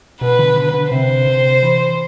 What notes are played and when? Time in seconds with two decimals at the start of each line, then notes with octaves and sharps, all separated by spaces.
0.21 B2 B4
0.39 D3
0.56 D3
0.73 D3
0.92 C3 C5
1.27 C3
1.63 E3